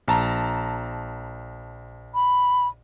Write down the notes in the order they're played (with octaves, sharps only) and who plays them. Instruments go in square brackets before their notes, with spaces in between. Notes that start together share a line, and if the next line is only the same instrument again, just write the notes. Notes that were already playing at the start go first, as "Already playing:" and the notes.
[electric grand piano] A#1 A5 A#5
[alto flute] B5